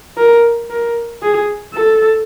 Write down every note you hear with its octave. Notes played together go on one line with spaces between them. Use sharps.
A#4
A#4
G#4
A4